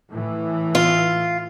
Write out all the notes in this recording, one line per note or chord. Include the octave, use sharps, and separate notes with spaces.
A2 E3
F4